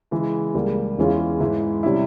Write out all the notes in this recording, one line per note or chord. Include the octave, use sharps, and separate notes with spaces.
C#3 E3 G#3
C#2 C#3 G3 A#3
E2 E3 G#3 C#4 F4
G#2 E3 G#3 E4
C3 G3 C#4 E4